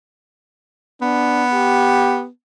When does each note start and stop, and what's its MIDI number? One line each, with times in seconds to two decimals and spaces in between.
1.02 2.28 59
1.02 1.46 62
1.53 2.25 67